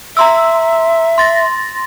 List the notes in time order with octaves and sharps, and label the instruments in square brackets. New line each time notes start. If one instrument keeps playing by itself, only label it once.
[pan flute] E5 [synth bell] A#5 C6 E6
[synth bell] C6 A6 A#6